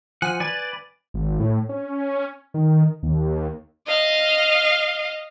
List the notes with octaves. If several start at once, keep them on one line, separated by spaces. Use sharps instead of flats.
F3 F#5 G#5
B4 D5 G#5 A6
G#1
A2
C#4
D#3
D#2
D#5 F5